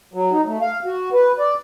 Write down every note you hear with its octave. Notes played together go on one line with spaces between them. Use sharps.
F#3
D#4
A3
F5
F#4
B4
D5